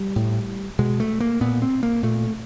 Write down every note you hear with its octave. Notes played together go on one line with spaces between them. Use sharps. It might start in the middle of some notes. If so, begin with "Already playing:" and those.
Already playing: G3
A2
B2 G#3
A3
A#3
A#2 B3
C4
A#3
A#2 A3